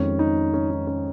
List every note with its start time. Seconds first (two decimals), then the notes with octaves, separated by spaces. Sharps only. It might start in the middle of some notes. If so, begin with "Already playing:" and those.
Already playing: F2 D#3 G#3 C#4
0.19 D#4
0.54 C#4
0.71 D#4
0.87 C#4